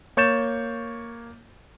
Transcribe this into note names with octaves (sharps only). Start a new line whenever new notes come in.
A#3 C#5 C#6 G6 A6 E7